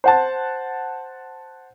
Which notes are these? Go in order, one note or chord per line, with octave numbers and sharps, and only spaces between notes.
C5 F#5 A5